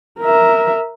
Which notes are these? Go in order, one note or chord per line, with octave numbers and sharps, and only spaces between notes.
A#4 E5